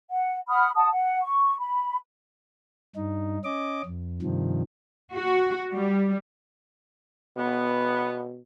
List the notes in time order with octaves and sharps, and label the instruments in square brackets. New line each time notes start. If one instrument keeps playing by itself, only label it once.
[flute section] F#5
F#5 B5 D#6 F6
F#5 A5 D#6
F#5
C#6
B5
[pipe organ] G2 D#4
C#4 D#5 D6
F2
G2 C3 D#3 F3
[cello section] F#4
G3
[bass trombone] B2 [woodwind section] B3